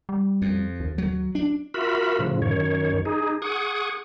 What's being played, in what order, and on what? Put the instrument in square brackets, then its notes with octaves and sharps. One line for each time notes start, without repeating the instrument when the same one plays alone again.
[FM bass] G3
[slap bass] F2
[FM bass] D#2
[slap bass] F#3
D4
[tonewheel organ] F4 F#4 A#4 E5 B5
A2 C#3 F3
F#2 D#3 C#5
D#4 G#4
G#4 F#5 C#6 D#6